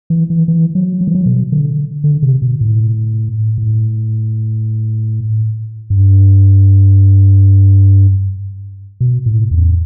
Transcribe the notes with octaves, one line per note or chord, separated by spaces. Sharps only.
E3
E3
E3
F#3
F#3
E3
F#3
B2
D3
D3
C3
B2
A2
A2
G2
B2
A2
E2